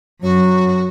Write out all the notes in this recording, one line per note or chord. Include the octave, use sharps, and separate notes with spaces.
F#2 F#3 F#4